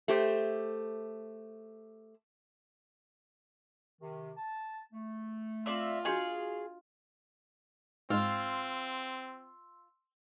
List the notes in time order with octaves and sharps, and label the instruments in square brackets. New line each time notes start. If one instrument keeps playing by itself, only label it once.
[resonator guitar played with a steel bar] A3 G4 C5
[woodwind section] C3 D#3
A5
A3
[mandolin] C4 D5 E5 [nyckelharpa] F4
[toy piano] D4 F#4 D#5 [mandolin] G#4 F5 C#6
[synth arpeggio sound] G#2 G#3 [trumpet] C4 [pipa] F4 [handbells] C6 E6